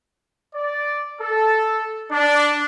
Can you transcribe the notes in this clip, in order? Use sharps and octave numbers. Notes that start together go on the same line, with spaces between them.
D5
A4
D4